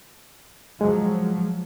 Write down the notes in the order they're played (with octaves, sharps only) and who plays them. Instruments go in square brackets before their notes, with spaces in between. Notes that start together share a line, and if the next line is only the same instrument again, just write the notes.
[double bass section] F3 F#3 [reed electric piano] G#3